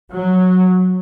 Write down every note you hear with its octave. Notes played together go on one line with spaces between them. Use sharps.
F#3